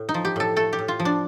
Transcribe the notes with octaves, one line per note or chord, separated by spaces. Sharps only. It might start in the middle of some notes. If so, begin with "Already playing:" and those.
Already playing: A2
D#4
F3
G4
A2 A4
A3 A4
G4
A2
F4
F3
D4